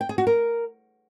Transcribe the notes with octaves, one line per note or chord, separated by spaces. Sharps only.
G5
G#4
F#4
A#4